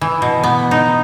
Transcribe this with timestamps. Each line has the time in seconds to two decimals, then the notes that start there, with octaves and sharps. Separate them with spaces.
0.01 E3
0.22 B2
0.44 B3
0.71 D#4